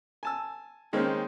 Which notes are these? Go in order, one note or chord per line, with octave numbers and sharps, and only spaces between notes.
G#5 A5 E6
D#3 G#3 A#3 C4 C#4 D#4